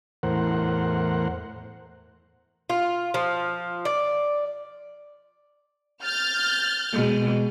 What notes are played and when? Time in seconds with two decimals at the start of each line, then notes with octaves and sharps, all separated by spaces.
0.23 E2 A2 A#4 C5 F#5
2.70 F4
3.14 F3
3.85 D5
6.03 F6 G6 A6
6.93 B2 G#3